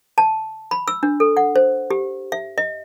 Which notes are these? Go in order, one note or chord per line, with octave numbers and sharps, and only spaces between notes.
A5
B5
E6
D4
A4
F#5
C5
G4
E5
D#5